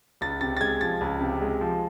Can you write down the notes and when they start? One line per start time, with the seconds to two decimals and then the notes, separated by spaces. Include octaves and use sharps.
0.21 C#2 A6
0.41 C3 A6
0.57 A6
0.61 G#3 G#6
0.81 F3 A6
1.01 C#2
1.21 C3
1.41 G#3
1.61 F3